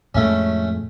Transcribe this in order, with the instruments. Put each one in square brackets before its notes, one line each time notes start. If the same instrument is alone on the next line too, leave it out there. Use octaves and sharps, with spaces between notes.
[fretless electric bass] F2 A2 G#3 [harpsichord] A3 C#4